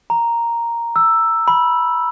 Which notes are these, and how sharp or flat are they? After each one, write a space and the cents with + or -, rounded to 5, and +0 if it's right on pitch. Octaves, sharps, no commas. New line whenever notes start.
A#5 +0
E6 +5
B5 -15